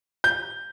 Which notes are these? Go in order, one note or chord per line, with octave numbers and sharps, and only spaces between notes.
G6